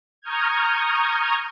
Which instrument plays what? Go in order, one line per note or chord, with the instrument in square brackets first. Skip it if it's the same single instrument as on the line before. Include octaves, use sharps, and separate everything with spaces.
[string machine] A#5 C#6 D#6 F6 G6 G#6